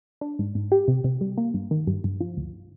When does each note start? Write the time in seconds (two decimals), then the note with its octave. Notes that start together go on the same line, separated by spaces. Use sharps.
0.21 D4
0.39 G#2
0.55 G#2
0.72 G4
0.88 C3
1.04 C3
1.21 G3
1.38 A#3
1.54 G2
1.71 D#3
1.87 G2
2.04 G2
2.21 F3
2.37 D2